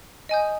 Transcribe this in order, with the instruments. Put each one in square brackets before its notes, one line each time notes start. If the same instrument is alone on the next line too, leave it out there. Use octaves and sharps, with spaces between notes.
[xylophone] D#5 G#5 D#6 G6